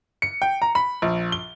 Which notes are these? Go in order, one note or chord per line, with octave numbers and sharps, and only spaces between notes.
C#7
G5
A#5
B5
A#1
G7